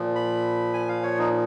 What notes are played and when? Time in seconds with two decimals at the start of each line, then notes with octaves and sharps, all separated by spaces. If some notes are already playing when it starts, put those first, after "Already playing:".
Already playing: A#2 F3
0.15 B5
0.74 G#5
0.89 F5
1.03 C#5
1.18 D#4